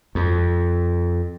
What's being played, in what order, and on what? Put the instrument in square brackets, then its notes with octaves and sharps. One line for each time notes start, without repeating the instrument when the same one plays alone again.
[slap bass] F2